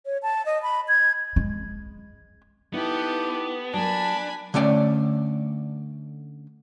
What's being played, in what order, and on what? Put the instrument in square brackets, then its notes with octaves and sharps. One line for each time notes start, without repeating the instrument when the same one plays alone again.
[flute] C#5
A5
D#5
B5
G#6
[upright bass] G#3
[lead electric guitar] B3 [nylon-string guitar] D#4 E4 [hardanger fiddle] G4 A4
[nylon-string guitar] F#3 A#3 [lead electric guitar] D4 [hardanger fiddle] G#5 B5 [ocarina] A5
[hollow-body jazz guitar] D3 A3 C#4 D5 G5